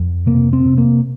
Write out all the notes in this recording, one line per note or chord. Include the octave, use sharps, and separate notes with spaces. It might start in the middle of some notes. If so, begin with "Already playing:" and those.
Already playing: F2
C3 A#3
C4
C3
A#3